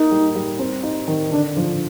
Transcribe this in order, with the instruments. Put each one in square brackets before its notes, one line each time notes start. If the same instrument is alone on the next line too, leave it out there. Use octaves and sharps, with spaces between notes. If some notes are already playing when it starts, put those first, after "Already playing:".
Already playing: [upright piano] A#3 [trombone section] D#4
[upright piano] G3
G3
C4
D#4
D#3
[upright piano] D3 [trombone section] D4
[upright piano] F3